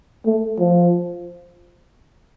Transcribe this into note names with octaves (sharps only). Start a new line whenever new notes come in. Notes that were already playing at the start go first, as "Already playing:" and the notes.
A3
F3